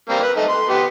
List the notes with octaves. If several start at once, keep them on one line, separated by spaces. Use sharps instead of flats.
G3 A#3 C4
B4
A3 D#4
C6
B3 G4